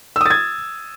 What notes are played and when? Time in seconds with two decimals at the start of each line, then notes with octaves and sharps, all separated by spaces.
0.16 E6
0.21 D#6
0.26 A6
0.30 G#6